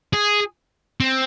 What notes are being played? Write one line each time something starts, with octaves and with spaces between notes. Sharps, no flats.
G#4
C4